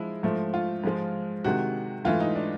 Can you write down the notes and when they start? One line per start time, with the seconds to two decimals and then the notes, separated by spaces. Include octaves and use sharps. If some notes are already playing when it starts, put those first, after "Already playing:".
Already playing: F3 G#3 E4
0.23 G#2 F3 A3
0.54 F4
0.84 G#2 F3 G#3
1.44 C3 D#3 G#3 F#4
2.05 G#2 E3 A3 F4
2.20 D#4
2.35 D4